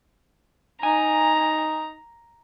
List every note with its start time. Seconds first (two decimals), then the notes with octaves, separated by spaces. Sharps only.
0.83 D#4 G#5 A#5